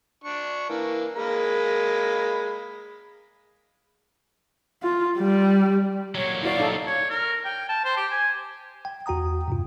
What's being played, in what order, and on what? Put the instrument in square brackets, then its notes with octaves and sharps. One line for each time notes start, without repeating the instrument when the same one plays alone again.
[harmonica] D4 C#6
E3 A#3
G#3 A#3 B5
[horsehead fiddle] F4
G3
[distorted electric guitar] A#2 F#3 [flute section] C#5
[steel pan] E4 F#4 C#5 [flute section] D5 F5
[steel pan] D#4 A4
[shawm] C#5
A#4
G5
A5
C5
G4
G#5
[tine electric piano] G5
E2 F#4 G5 A#5 D#6
G2 C3 F4